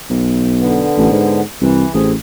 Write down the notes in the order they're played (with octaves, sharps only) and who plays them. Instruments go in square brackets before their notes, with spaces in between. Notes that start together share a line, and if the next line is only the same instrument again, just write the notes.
[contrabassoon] B1
[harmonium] D3 B3
[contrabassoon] A1
G#2
[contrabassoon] C2 [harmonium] E3
[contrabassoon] A1 [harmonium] C4 G#4